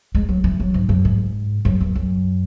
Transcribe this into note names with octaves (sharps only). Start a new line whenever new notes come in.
G#3
F#3
E3
F#3
G#2
F#2
G#2
F#2
E2
F#2